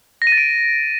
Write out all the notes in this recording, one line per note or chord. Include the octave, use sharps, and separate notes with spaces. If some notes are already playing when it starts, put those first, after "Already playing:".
A#6
D#7
A6
D7